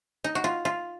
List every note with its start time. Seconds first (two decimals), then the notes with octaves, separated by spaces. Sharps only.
0.24 D#4
0.35 F#4
0.44 F4
0.65 F4